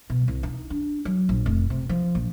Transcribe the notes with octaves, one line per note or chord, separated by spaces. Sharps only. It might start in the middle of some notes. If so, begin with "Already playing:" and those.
B2
C2
D#4
D4
F#3
A#1
F1
C3
F3
A#1